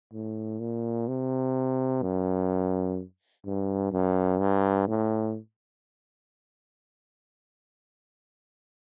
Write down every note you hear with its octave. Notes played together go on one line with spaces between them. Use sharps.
A2
A#2
C3
F#2
G2
F#2
G2
A2